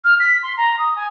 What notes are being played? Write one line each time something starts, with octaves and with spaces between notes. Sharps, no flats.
F6
B6
C6
A#5
D#6
G#5